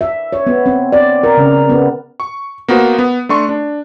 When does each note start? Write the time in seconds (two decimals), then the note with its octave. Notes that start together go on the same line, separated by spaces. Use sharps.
0.01 E5
0.33 C#5
0.47 B3
0.66 C4
0.92 D5
1.23 A#4
1.37 C#3
1.69 B3
2.20 C#6
2.68 A#3 B3 F#4 C5
2.99 B3
3.29 A3 D4 C6 C#6
3.49 D4